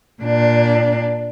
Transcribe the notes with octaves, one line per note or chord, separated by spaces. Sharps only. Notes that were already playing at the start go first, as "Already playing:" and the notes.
A#2 D4